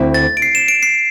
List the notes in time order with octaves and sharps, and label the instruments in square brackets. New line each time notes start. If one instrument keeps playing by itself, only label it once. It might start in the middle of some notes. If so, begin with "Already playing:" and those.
Already playing: [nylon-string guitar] D2 C4 E4
[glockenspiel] A6
D7
C7
E7
D7
C7